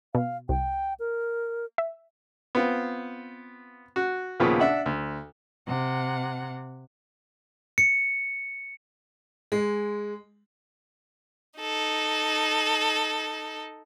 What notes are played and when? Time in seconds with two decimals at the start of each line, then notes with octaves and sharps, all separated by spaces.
0.15 B2 F5
0.49 C2 G5
1.00 A#4
1.78 E5
2.55 B3 C4 F4
3.96 F#4
4.40 D#2 A#2 C#3 F3 B3
4.60 D4 E5 F#5
4.86 D2
5.67 C3 F#5
7.78 C#7
9.52 G#3
11.60 D#4 A4